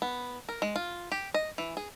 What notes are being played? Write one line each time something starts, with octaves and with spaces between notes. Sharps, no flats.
B3
A#4
G#3
F4
G4
D#5
E3
G#4